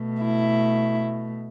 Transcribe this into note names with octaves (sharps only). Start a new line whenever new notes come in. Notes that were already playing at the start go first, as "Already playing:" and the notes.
Already playing: B2 A3
E4